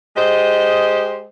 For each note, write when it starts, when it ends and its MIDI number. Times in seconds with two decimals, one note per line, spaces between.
0.17 1.24 56
0.17 1.24 67
0.17 1.24 72
0.17 1.24 75